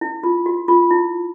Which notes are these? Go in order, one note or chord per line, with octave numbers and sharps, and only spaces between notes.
E4
F4
F#4
F4
E4